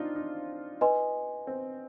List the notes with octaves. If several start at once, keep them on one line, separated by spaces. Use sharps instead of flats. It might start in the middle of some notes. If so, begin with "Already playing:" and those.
Already playing: C4 D4 D#4 F4
D#4
B4 D#5 G#5 C6
C4